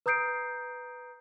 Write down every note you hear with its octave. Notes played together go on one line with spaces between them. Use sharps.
B4 A#5 D#6 G6 C7 D7